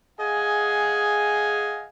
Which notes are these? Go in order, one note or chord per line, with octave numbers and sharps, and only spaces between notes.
G#4 D#5 F5 F#5 G#5